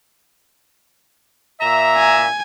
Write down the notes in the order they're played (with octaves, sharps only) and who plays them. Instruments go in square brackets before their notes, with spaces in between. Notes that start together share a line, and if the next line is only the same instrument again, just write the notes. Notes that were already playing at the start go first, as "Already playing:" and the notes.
[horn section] A#2 E5 [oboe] A#5
[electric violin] G#5